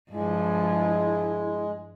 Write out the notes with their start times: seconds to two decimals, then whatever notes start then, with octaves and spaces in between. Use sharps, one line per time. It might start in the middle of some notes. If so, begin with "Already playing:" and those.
0.12 G2 F3 G#3 E4